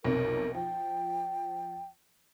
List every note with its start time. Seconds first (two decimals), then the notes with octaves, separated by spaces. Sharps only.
0.04 B1 F2 C3 A#4
0.55 F3 G5